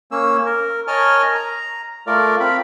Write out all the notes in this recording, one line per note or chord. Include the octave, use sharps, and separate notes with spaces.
A#3 C#4 E6
A#4
A#4 C#5 D#5 G#5 A5 F6
A#5
A3 F4 A#4 D5
C4 F4 B5